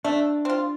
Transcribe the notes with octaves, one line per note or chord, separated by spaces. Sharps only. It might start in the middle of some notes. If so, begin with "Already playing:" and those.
A3 D4
C4 F4